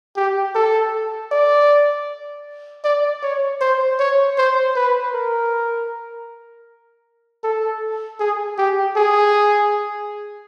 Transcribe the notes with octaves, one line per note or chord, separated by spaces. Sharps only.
G4
A4
D5
D5
C#5
C5
C#5
C5
B4
A#4
A4
G#4
G4
G#4